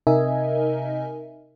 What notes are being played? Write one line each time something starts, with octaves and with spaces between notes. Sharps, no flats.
C3 D#4 A#4 D#5 E5 G#5